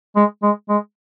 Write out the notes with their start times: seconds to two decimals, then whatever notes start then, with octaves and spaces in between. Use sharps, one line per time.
0.16 G#3
0.43 G#3
0.69 G#3